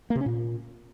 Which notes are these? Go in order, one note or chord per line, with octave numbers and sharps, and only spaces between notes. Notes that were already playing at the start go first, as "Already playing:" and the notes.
A#3
C3
C#4
A#2